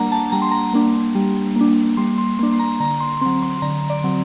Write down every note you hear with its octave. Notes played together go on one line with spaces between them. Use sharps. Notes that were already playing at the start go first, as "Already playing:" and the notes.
Already playing: G3 A#3 D4 F#5 A#5
A5
G3 A#5
C6
A#5
A#3 D4
G3
A#3 D4
G3 C6
C6
A#3 D4 C6
C6
A#5
D3 A#5
C6
F#3 C4 C6
C6
D3 A#5
D5
F#3 C4